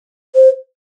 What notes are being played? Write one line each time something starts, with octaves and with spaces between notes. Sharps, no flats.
C5